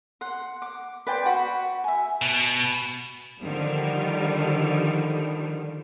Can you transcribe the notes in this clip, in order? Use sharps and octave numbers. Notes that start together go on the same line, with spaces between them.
F#5 C6
D6
B4 D5 G5 C6
F#4 B5
E5 G#5
B2
D3 D#3 F3 G3